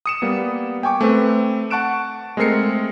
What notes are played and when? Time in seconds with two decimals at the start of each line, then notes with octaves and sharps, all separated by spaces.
0.06 D#6 C#7 E7
0.22 G3 A#3 B3
0.83 G5 G#5 C#6 D6
1.01 A3 C4 B4
1.70 F#5 A5 C#6 F#6 D7 E7
2.37 G#3 A3 C4 A#4 C7 C#7